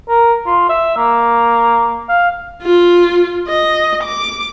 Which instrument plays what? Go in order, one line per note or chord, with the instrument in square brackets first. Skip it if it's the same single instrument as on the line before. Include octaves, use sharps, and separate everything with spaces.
[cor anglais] A#4
F4
E5
A#3
F5
[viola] F4
D#5
D6